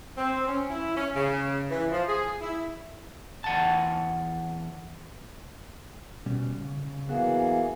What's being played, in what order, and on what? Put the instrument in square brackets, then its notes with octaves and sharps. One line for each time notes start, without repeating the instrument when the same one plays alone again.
[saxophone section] C4
C#4
E4
C#4
C#3
E3
F3
G#4
E4
[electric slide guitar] E2 F#5 A5
B2 G3 C#4
C#3
C#3
[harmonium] E3 A#3 G#4 [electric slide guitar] F#3 B3 F#4